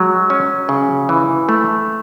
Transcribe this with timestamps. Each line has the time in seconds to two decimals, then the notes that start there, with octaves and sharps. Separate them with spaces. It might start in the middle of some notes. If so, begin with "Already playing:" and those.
Already playing: F#3 G#3
0.30 C#4
0.69 C#3
1.09 E3
1.49 A3